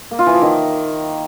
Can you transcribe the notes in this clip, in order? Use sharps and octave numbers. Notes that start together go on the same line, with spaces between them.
A#3
F4
E3
F3
D#3